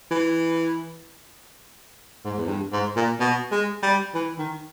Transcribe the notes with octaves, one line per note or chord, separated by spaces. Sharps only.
E3
G#2
E2
G2
G#2
A#2
B2
G#3
G3
E3
D#3